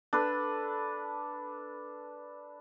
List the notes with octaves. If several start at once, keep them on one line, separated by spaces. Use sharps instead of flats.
D4 A4 B4